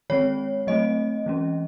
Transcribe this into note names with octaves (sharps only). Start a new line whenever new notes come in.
D#3 G#3 C4 C#5
F#3 A3 C4 D#5
E3 G#3 C#4